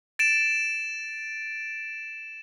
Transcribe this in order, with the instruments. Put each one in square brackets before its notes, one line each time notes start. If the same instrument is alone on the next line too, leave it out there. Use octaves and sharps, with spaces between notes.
[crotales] A6 D7 E7